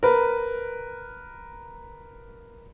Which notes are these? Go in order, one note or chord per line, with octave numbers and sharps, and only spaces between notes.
A#4 B4